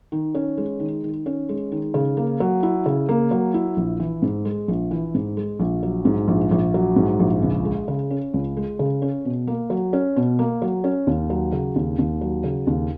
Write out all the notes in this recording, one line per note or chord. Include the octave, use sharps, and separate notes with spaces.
D#3
C#4
G#3
D#3
D#3
C#4
G#3
D#3
C#3
A#3
F#3
E4
C#3
A#3
F#3
E4
A#1
E3
G#2
G#3
A#1
E3
G#2
G#3
A#1
F#3
G#2
A#1
A#1
F#3
G#2
A#1
C#2
G#3
C#3
C#4
C#2
G#3
C#3
C#4
B2
A#3
F#3
C#4
B2
A#3
F#3
C#4
D#2
F#3
C#3
D#2
D#2
F#3
C#3
D#2